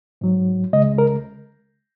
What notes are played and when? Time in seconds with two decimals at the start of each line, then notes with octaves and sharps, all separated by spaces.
0.21 G#2 F#3
0.73 C#2 C#3 G#3 D#5
0.98 A#4